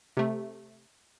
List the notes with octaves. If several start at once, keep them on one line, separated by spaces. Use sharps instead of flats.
C3 A3